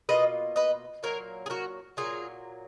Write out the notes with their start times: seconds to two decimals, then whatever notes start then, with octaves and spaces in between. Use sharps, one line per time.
0.09 B2 A#3 F4 B4 D#5
0.56 B4 D#5
1.03 A#2 F#3 A#3 A#4 C#5
1.46 G#4
1.50 F#4 A#4
1.97 A#2 F#3 A#3 F4 G#4